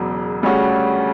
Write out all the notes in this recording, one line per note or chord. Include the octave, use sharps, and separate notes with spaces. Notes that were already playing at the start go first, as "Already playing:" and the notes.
Already playing: E1 E2 C#3 F#3
D2 C#3 G3 C#4 F#4